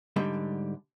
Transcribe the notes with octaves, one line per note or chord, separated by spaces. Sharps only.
G#2 D3 G3